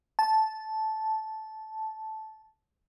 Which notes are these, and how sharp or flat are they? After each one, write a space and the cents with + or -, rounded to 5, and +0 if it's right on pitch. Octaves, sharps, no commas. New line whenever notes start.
A5 -10